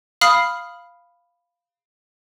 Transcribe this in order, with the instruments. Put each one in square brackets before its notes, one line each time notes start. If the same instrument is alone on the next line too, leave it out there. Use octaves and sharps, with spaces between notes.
[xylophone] F5 B5 D#6 F6 C7